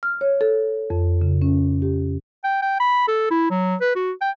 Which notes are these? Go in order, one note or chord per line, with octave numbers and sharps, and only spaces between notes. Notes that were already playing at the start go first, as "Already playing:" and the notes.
F6
C#5
A4
F2
C#3
C#4
G4
G5
G5
B5
A4
E4
F#3
B4
F#4
G5